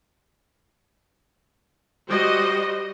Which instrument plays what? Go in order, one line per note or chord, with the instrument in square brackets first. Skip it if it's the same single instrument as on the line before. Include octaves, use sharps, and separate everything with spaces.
[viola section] G3 F#4 C5 D#5